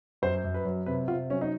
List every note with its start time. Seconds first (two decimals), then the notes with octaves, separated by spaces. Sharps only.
0.22 F#2 C5
0.44 F#2
0.54 B4
0.65 F#3
0.86 C3 B4
1.08 C3 F4
1.30 F#3 C#4
1.41 D#4